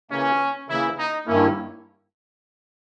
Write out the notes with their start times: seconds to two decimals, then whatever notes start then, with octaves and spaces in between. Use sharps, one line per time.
0.10 C#3 E3 A#3 C#4
0.68 C#3 E3 A#3 E4
0.98 D#4
1.27 G2 D#3 A#3 C#4 E4